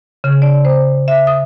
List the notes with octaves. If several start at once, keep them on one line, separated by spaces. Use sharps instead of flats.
C#3
D5
C5
E5
D#6